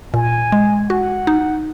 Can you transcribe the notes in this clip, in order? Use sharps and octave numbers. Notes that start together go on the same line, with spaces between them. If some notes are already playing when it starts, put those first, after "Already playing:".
A#2 G#5
G#3
F#4 F#5
D#4